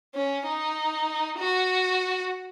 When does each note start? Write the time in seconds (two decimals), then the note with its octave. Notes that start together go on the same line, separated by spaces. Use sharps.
0.15 C#4
0.46 D#4
1.39 F#4